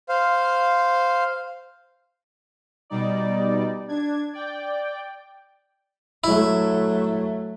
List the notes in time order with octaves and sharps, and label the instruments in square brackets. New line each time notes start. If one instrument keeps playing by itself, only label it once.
[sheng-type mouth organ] C5 F5
[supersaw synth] B2 G3 D#4 D5
D4 G#6
D5 G5
[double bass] F#3 A3 [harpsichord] E4